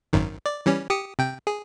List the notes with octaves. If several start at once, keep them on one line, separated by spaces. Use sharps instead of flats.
G#1 F#2 D#3
D5
E3 G3 C#4
G4 D#6 C#7
C3 G5
G#4